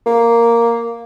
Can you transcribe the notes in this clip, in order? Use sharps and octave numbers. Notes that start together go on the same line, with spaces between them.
A#3